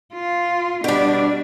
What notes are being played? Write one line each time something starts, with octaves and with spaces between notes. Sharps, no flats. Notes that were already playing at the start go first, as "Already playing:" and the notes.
F4
B2 G3 D4